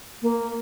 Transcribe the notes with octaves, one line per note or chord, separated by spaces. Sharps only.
A#3